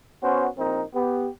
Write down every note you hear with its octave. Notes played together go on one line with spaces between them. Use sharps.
B3 C#4 F#4 C5
A#1 C4 D#4 A#4
B3 G4